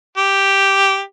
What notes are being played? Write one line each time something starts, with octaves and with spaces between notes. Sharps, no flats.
G4